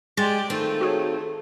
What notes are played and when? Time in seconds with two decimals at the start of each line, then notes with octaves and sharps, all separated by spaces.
0.17 G#3 G4 D5 C6 A6
0.50 D#3 A3 C4 F4
0.81 F#4 G#4 C#5